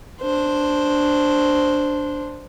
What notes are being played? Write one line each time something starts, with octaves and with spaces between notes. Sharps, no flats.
D4 C5